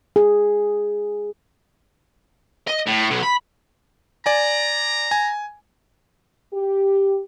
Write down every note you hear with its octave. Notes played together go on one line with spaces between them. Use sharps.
G#4
D#5
A2
B1
B5
D5 G#5 A#5
G#5
G4